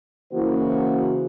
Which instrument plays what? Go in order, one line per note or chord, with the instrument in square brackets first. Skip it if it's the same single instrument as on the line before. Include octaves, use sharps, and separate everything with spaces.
[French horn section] C#3 E3 A#3 E4 F#4 C5